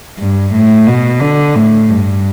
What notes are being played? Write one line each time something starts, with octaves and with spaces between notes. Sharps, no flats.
G2
A2
B2
D3
A2
G2